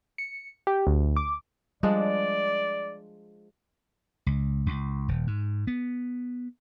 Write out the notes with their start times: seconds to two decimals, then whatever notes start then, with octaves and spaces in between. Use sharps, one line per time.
0.18 C#7
0.67 G4
0.87 D2
1.16 D6
1.83 F3 G3 G#3 D4 D5
4.26 C#2
4.66 C#2
5.08 D#1
5.27 G#2
5.67 B3